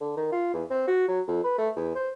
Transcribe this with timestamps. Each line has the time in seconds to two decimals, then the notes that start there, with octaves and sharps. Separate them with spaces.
0.01 D3
0.17 D#3
0.32 F4
0.54 E2
0.70 C4
0.87 F#4
1.08 F#3
1.27 F2
1.44 B4
1.58 A3
1.76 E2
1.95 C5